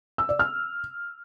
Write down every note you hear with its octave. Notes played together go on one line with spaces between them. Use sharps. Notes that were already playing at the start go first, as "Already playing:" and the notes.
E6
D5
F6